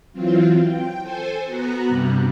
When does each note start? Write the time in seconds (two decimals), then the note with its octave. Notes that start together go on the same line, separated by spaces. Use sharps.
0.13 E3 F#3 C4 F4
0.63 G5
1.02 A4 C5 G#5
1.46 B3 F#4 A#5 F#6
1.87 G2 C3 G3